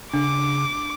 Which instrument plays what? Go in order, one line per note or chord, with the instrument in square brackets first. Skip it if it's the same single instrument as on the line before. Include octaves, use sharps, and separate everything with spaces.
[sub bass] C#3 [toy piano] D4 [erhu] D6